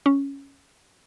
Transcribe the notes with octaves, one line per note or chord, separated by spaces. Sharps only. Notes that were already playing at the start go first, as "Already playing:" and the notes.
C#4